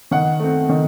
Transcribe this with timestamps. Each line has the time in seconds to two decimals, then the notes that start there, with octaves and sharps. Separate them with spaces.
0.11 D#3 F#5
0.40 A3 C4
0.69 D#3